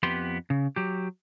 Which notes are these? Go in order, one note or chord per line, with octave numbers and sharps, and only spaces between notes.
F2 B3 G4 B4 C6
C#3
F#3 G4